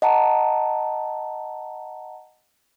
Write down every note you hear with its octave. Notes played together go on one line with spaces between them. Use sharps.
D#5 F#5 A5 A#5